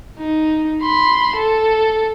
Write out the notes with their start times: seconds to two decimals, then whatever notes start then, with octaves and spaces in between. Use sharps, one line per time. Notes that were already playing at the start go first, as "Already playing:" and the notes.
0.19 D#4
0.82 B5 C6
1.36 A4